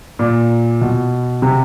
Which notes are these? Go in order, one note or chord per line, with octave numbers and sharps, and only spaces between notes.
A#2
B2
C3